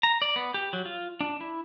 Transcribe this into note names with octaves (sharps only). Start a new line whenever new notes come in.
A#5
D5
B3
G4
F#3
F4
D4
E4